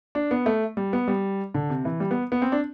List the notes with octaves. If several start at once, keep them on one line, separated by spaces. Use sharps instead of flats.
D4
B3
A3
G3
B3
G3
D3
C3
E3
G3
B3
B3
C4
D4